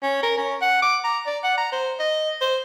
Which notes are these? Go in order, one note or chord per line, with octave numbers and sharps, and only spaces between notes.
C#4
A#4
C#4
F#5
D6
A#5
D5
F#5
A#5
C5
D#5
C5